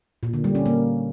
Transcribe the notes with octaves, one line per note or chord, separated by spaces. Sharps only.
A#2
D3
G3
C#4
A#3